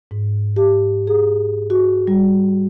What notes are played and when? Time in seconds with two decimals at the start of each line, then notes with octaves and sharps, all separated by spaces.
0.11 G#2
0.56 G4
1.07 G#4
1.70 F#4
2.07 G3